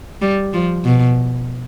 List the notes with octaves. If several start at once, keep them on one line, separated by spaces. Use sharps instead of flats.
G3
F3
B2